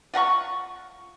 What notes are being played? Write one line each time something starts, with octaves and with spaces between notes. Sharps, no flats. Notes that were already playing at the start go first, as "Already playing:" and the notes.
F4 F#5 A#5 C#6